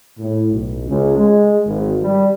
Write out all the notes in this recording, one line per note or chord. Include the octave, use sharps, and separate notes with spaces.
A2
B1
C#2
G#3
G#1
G3